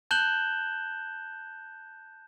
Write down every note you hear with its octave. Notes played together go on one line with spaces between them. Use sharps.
A5 F#6 G6 E7 F#7 G7